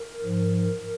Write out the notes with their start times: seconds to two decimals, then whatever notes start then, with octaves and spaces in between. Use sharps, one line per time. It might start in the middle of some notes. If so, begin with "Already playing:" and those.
Already playing: A#4
0.23 G#2 F3